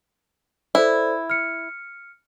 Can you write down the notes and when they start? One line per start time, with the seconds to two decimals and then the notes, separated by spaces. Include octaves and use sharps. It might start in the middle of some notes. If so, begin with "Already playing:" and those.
0.75 E4 A4 C5 D5
1.30 F6 C#7